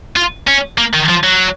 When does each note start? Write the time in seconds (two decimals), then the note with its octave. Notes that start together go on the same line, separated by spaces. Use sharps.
0.16 F4
0.48 C#4
0.78 A#3
0.93 D#3
1.09 F3
1.23 F#3